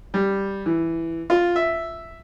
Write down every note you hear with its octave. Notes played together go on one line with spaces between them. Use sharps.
G3
E3
F4
E5